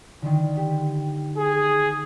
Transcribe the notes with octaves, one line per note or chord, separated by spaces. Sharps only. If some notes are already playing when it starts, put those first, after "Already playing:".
D3 D#3
G4
G#4